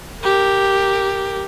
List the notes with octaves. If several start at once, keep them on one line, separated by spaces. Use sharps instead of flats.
G4 A#4